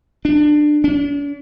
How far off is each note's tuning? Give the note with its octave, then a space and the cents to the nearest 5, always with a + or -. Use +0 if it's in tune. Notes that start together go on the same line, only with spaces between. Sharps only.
D4 +20
D4 -45